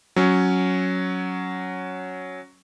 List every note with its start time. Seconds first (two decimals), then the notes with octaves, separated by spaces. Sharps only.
0.16 F#3 C#4